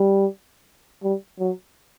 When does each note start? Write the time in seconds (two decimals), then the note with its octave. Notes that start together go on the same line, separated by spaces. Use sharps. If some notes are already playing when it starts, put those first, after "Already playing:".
Already playing: G3
1.03 G3
1.39 F#3